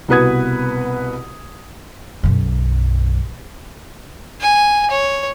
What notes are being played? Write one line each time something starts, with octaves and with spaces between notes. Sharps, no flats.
C2 B2 F#4 B4 D#6 G#6
B1 F#2
G#5
C#5